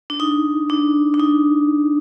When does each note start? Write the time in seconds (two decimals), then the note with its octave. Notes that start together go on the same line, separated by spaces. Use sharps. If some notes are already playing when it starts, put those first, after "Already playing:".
0.10 D4
0.20 D#4
0.70 D4
1.14 D4
1.20 D#4